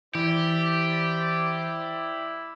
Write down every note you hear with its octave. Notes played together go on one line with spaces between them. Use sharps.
E3 E4 G4 C5 D5